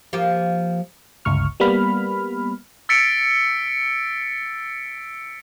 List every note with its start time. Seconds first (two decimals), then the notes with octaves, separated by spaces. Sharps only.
0.13 F3 A#3 G4
1.25 G1 C#2 C#6 F6
1.60 G3 A#3 B3 B5 F6
2.89 E6 A6 B6 C#7 D7